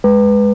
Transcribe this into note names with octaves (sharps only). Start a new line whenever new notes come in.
G#3 B4